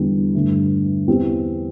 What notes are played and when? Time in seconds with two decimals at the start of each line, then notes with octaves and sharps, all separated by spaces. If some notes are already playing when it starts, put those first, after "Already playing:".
Already playing: E2 D3 G3
0.35 G2 D3 A3
1.07 E2 E3 C4 G4